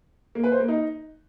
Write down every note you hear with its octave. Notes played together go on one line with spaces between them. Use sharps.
A#3
B4
C5
A#3
D#4